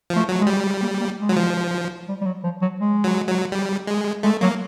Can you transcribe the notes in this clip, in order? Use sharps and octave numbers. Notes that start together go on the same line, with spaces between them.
F3
A3
F#3
G#3
G3
A#3
A#3
G#3
F#3
F3
G3
G3
F#3
F3
F#3
G#3
F#3
F#3
G3
G#3
G#3 A3
F#3 A#3